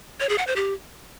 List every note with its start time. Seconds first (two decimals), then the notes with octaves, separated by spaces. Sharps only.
0.20 C#5
0.29 G#4
0.38 F#5
0.47 C5
0.56 G4